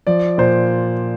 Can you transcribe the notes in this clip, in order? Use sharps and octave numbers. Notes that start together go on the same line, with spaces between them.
F3 D5
A#2 C5